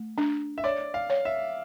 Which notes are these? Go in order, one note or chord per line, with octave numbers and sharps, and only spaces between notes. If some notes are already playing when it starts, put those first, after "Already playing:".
Already playing: A3
D4
E5
C#5 D5
F5
C#5
E5